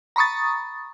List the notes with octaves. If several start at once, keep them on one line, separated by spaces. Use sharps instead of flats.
A#5 B5 C#6 D#6 A6